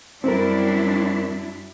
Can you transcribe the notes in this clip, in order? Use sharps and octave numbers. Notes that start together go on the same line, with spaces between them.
F#2 G3 C4 D4 E4 A#4